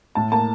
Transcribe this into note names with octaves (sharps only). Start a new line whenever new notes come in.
A2 A5
A#3 A5